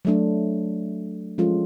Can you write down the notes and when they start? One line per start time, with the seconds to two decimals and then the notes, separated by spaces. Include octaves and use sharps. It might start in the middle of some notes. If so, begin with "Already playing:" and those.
0.05 F#3 A3 D4
1.38 F3 G#3 C#4 F4 A4